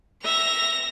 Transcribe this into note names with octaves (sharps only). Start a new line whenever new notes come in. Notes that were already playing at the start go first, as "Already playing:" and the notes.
E5 A#6 F7